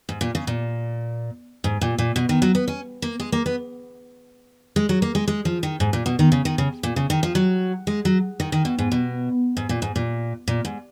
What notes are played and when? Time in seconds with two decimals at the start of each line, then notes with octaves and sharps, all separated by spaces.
0.09 G#2
0.21 A#2
0.35 C#3
0.47 A#2
1.64 G#2
1.81 A#2
1.98 A#2
2.16 B2
2.29 D#3
2.42 F#3
2.55 B3
2.68 C#4
3.02 A#3
3.20 G#3
3.32 A#3
3.46 B3
4.76 G#3
4.89 F#3
5.02 A#3
5.15 G#3
5.28 G#3
5.45 F3
5.63 D#3
5.80 G#2
5.93 A#2
6.06 B2
6.19 D#3
6.32 C#3
6.45 D#3
6.58 C#3
6.83 A#2
6.96 C#3
7.10 D#3
7.23 F3
7.35 F#3
7.87 G#3
8.05 F#3
8.40 D#3
8.52 D#3
8.65 B2
8.78 G#2
8.92 B2
9.57 G#2
9.69 A#2
9.82 G#2
9.96 A#2
10.48 A#2
10.65 G#2